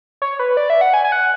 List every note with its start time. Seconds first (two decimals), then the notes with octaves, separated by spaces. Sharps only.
0.22 C#5
0.39 B4
0.57 D5
0.70 E5
0.81 F#5
0.94 G#5
1.04 G#5
1.12 F#5